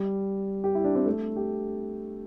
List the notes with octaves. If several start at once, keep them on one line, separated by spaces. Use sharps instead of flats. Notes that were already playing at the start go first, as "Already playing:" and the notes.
Already playing: G3
G4
E4
D4
C4
A3
G4